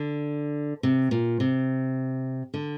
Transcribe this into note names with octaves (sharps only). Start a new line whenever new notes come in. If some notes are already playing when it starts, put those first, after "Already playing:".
Already playing: D3
C3
A#2
C3
D3